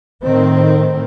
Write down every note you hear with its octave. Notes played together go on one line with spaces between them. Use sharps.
A2 D#3 C4